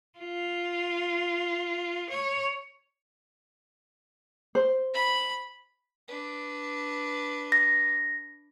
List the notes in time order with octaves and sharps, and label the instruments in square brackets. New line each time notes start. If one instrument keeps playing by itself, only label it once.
[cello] F4
C#5
[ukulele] C5
[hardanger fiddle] B5
D4 B4
[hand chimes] A#6